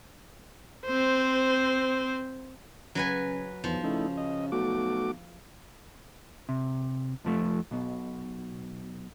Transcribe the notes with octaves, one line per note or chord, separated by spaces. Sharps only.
C4 C5
C#3 F#3 B4 G#5
B1 E2 F3
C#3 A3 D#4 E4
D#5
B1 A3 F#4 D6
C3
F2 F3 A3
B1 B2